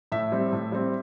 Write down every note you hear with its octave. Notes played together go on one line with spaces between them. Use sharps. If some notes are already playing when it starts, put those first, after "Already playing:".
A2 E5
G3 C4
A2
G3 C4